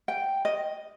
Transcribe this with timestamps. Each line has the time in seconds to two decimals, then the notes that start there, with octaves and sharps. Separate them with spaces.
0.08 G5
0.45 D#5